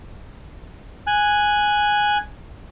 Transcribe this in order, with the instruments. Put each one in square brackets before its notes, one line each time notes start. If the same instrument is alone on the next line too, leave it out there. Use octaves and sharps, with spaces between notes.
[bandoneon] G#5 F#6